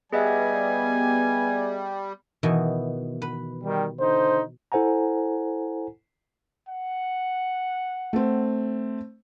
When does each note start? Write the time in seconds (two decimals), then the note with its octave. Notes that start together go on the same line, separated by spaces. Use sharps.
0.13 G3 B3 G#4 D#5 E5 G#5
2.43 B2 D#3 E3
3.22 B4
3.64 D#3 G3
3.99 D3 D#4 C5
4.72 E4 A4 C5 F#5 G#5 A#5
6.68 F#5
8.13 A3 C4